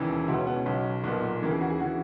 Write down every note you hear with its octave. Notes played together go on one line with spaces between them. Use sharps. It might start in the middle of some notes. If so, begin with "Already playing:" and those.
Already playing: E1 D#2 C#3 E3
C#2 B2 B3 E4
C#4
B3
C#4
B1 B2
B1 A#2 B3
A#3
D#2 C#3 E3 A#3
G#4
F#4
G#4
C#3 E3 F#4